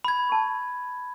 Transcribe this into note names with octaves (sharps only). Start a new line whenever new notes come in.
B5 G#6
A5 C#6